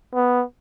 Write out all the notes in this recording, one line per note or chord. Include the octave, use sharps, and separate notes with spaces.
B3